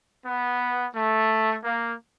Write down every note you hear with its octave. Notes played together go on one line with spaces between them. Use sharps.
B3
A3
A#3